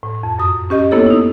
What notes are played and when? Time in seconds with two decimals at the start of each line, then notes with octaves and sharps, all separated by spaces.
0.03 A2
0.23 F2
0.39 F#2 D#6
0.70 C#4 G4 D#5
0.91 A#3 B3 E4 A4 C#5
1.06 D#4 E4